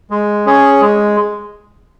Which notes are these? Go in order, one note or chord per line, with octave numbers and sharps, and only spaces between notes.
G#3
C#4 G#4 C#5
G#3